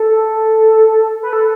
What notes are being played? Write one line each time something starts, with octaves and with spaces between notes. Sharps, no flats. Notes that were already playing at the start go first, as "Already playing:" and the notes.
Already playing: A4
B4
A4